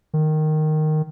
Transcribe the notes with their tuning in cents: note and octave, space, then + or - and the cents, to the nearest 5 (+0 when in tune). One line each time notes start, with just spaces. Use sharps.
D#3 -10